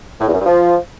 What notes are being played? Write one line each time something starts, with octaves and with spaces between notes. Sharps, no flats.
A2
E2
F#2
G2
F3